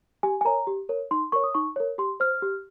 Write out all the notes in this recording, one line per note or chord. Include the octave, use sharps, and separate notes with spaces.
G4 G#5
G#5
A#4 C#5 A#5
G4
A#4 C#5
D#4 C6
A#4 C#5 C#6
D#6
D#4 C#6
A#4 C#5
G4 C6
C5 F6
G4